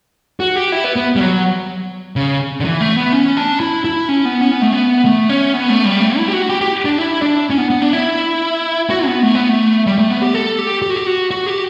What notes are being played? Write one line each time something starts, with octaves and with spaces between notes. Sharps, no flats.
F#4
G4
E4
B3
B3
G3
F#3
C#3
D3
E3
A3
B3
C#4
D4
E4
E4
C#4
B3
C#4
B3
A3
B3
A3
C#4
B3
A3
G3
A3
E4
G4
F#4
G4
G4
D4
E4
D4
C#4
B3
B3
D4
E4
F#4
B3
A3
B3
A3
G3
A3
B3
G4
A4
G4
G4
F#4
G4
F#4
F#4
G4